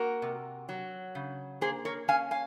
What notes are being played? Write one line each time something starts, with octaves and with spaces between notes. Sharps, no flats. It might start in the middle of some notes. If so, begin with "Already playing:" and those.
Already playing: A#3 F#4 A#4
C3
F#3
C#3
A#3 G#4 C5
A#4 C#5
C#4 F5 G#5
F5 G#5